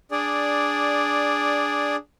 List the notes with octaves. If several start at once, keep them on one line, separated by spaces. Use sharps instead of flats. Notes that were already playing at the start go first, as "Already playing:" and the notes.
D4 G#4 D5